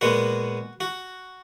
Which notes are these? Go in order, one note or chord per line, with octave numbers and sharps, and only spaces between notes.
A#2 G#3 B3 F#4
F#4